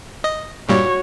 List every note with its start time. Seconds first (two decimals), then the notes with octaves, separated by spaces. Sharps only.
0.24 D#5
0.69 G2 A#2 G3 F#4 C#5